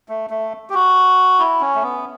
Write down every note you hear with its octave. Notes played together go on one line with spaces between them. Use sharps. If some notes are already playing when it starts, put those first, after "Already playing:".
A3
A3
G4
F#4
E4
C#4
A3
B3